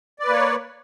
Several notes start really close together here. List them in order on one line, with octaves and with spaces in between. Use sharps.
D5 B4 A#3 C#5